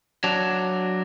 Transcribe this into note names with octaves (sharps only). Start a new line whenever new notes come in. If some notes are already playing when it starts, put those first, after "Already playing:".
F#3 D4